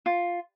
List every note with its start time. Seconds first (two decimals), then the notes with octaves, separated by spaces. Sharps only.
0.06 F4